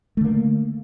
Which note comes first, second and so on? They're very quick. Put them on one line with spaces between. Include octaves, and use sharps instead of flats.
A3 D3 A#3